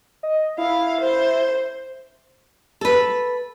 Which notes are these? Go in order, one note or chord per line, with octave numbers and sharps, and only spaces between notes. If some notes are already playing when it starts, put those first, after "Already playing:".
D#5
E4 F5
C5
A4 B4